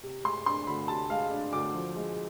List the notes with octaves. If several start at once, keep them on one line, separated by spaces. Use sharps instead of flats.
C3
G#3 C6
D4 C6
D2 B5
C3 A5
G#3 F5
D4
D2 D6
F3
G#3